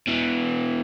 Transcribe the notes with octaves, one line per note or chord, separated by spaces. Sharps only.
B2 E3